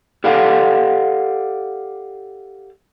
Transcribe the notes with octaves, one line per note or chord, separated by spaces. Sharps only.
G4 A4 D5 F5 F#5